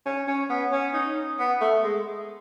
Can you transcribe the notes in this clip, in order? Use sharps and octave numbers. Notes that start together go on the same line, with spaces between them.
C#4
C#4
B3
C#4
D#4
B3
A3
G#3